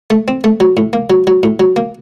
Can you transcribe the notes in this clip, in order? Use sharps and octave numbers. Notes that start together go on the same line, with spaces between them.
A3
C4
A3
F#3
A2
A#3
F#3
F#3
A2
F#3
A#3